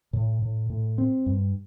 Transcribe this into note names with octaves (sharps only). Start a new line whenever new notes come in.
A2
A2
A2
C4
G2